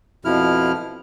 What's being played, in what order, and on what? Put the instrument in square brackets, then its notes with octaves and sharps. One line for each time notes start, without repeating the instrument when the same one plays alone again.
[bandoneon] F2 B2 F3 E4 F6